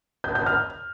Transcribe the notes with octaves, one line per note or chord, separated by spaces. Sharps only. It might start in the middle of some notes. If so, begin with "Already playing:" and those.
G6
G6
F6